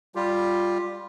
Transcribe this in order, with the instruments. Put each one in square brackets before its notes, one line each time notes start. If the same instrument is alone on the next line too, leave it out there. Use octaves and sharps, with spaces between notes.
[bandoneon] G3 F4 G4